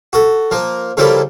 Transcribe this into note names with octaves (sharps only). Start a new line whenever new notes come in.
F#4 A4
F3 A#3
C#3 F3 G3 A#3 E4 A4